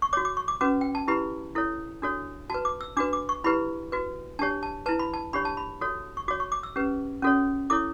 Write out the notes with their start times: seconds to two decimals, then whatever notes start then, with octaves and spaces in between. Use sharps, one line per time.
0.02 C#6
0.13 F#4 C#5 D6
0.25 D6
0.37 C#6
0.48 D6
0.61 C#4 F#4 B4 D6
0.81 G5
0.95 A5
1.08 E4 G4 B4 B5
1.55 E4 A4 C#5
2.02 D4 F#4 A4 C#5
2.50 F#4 B4 A5
2.65 D6
2.81 E6
2.97 D4 F#4 B4 D6
3.13 D6
3.29 C#6
3.44 E4 G4 B4 B5
3.92 F#4 B4
4.39 D4 G4 C#5 A5
4.63 A5
4.86 E4 B4 A5
4.99 B5
5.14 A5
5.33 D4 G4 C#5 B5
5.45 A5
5.57 B5
5.81 F#4 A4 C#5
6.17 C#6
6.28 F#4 C#5 D6
6.40 C#6
6.52 D6
6.63 E6
6.76 C#4 G4 B4
7.22 C#4 F#4 A4 C#5
7.70 E4 A4 C#5 D6